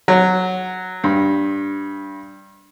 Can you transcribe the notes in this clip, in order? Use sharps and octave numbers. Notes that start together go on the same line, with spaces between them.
F#3
G2